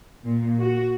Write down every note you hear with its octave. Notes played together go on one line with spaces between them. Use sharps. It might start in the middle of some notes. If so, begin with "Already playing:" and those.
A#2
F#4